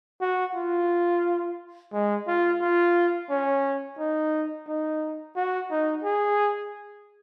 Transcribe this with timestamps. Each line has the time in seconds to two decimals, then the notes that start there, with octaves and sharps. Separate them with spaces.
0.21 F#4
0.55 F4
1.93 G#3
2.28 F4
2.61 F4
3.30 C#4
3.99 D#4
4.68 D#4
5.36 F#4
5.71 D#4
6.04 G#4